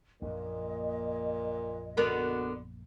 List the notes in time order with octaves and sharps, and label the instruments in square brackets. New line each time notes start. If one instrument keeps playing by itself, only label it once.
[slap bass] A#1 F#2 [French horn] A#2 [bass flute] D#5
[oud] D3 B3 A#4 [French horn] F#4